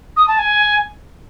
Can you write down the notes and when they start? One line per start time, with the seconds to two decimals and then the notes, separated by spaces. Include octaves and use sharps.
0.17 D#6
0.28 A5
0.38 G#5